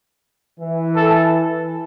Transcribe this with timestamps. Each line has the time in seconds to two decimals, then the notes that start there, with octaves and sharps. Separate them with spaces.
0.59 E3
0.96 A4